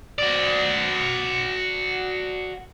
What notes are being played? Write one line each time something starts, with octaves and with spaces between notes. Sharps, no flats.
F#4 D5